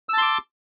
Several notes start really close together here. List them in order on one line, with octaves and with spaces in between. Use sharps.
E6 A5 C6 D6